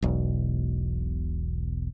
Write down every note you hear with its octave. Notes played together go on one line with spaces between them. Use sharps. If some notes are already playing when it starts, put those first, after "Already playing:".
E1 B1